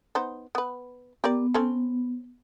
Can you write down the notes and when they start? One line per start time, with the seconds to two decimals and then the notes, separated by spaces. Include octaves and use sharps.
0.15 B3 D#4 C5
0.55 B3 B4
1.24 B3 G4 A#4 D5
1.54 C4 C#4 A4